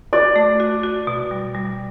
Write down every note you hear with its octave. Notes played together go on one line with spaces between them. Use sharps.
F#4 D5
A3
F#4
F#4
B2
G3
G3